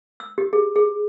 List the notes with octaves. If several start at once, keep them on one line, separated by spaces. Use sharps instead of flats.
E6
G4
G#4
G#4